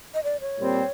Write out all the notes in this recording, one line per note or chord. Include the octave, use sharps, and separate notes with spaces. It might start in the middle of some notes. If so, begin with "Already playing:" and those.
D#5
D5
C#5
A#2 G3 C4